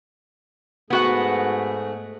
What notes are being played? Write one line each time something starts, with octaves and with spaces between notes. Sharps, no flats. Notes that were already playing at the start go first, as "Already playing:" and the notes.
G#2 A3 B3 F#4 G#4 F#5